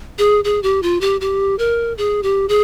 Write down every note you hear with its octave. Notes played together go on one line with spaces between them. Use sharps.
G#4
G#4
G4
F4
G4
G4
A#4
G#4
G4
G#4